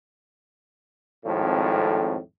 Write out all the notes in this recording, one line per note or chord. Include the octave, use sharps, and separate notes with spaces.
G#1 F2 A2